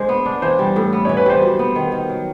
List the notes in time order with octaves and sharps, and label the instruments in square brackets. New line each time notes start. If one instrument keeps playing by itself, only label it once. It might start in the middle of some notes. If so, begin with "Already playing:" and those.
Already playing: [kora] G#3 D4 [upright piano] C5
[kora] B3
D4
[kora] E3 [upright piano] C5
[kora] G3
A2
B3
[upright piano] C#5
[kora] E3
[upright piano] B4
[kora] G3 [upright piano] C5
[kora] F#3
B3
D#3
D#3
F#3